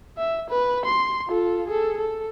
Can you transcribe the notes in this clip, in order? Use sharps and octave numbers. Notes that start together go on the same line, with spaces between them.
E5
B4
C6
F4 A4
G#4 A4
A4